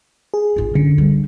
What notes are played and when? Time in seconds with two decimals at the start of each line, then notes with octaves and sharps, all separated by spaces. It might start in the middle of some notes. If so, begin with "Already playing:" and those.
0.34 G#4
0.56 G#1 F4
0.75 F#2 D3
0.98 G3 C4